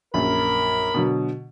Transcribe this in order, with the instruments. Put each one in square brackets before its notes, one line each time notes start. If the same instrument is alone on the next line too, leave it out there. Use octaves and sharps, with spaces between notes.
[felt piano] A#1 F#2 [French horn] A#4 [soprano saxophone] B5
[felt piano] B2 D3 F#3